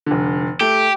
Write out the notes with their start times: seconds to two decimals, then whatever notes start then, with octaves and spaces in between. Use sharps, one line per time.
0.06 F1 D3
0.61 A3 G4